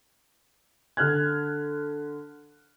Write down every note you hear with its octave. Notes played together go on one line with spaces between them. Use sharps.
D3 F6 F#6 G#6